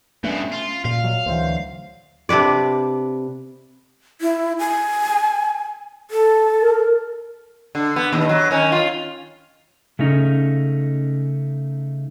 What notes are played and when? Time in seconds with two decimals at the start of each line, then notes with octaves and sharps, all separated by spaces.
0.24 G2 B2 A3 C#4
0.52 F4
0.85 A#2 F5
1.04 F#3
1.26 D2 E3 F#3 C5
2.29 C3 D4 B4 D5
4.21 E4
4.59 G#5
6.11 A4
6.62 A#4
7.75 D3
7.96 B3
8.13 D#2 B2
8.29 F#3
8.51 D#3 C#4
8.72 F4
9.99 C#3 A3 C#4 D#4